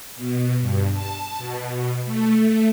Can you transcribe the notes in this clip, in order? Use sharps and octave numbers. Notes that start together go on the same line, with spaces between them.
B2
G2
A5
B2
A3